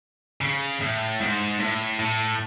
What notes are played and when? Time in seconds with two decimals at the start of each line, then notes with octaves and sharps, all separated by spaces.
0.41 C#3
0.81 A2
1.21 G#2
1.60 A2
1.99 A2